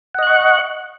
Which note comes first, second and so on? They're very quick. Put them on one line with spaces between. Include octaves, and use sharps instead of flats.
F#5 D#5 F#6 C#6